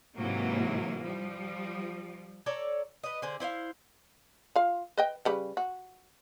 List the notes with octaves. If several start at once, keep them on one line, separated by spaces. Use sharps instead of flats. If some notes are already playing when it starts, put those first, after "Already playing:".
G#2 C3 E3 F#3 A#3
F3 G3
A4 C#5 D5 A#5
B4 D#5
D3 G#4 C5
E4 C5 D#5 F5
F4 F5
B4 D#5 G5
C#3 G3 B4
F#4